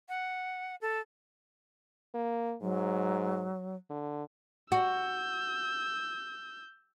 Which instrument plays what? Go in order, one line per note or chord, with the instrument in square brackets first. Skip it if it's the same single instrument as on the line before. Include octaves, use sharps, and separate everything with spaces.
[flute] F#5
A4
[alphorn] A#3
[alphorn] G#2 [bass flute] F#3
[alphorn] D3
[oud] F#4 [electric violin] E6 G6